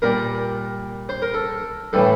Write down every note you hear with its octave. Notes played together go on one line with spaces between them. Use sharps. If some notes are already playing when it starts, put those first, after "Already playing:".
A#2 G3 A#4
C5
A#4
A4
A2 E3 G3 A4